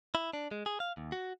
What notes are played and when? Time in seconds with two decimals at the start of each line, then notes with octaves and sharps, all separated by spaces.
0.15 E4
0.33 D4
0.51 G#3
0.66 G#4
0.80 F5
0.97 D#2
1.12 F#4